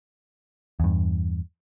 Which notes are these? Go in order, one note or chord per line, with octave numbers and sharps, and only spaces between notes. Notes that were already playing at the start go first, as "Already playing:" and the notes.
E2 G2